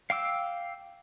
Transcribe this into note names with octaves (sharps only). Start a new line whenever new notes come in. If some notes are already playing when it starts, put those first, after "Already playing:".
F5 G5 D6 E6